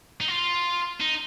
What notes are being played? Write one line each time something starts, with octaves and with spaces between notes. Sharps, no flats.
D#4
F4
D#4